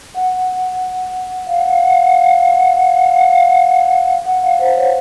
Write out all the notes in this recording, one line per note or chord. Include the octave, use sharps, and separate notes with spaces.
F#5
F5
F#5
F5
F#5
F5
F#5
F5
F#5
F5
F#5
F5
F#5
F5
F#5
F5
F#5
F5
F#5
F5
F#5
F5
C5
C#5